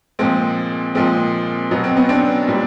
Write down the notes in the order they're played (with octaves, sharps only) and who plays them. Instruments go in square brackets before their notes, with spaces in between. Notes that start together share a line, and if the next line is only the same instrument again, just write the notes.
[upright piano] A#2 F3 G#3 C4
A#2 F3 G#3 C4
B2 F#3 B3
C4
B3 C#4
C4 D4
A#2 G3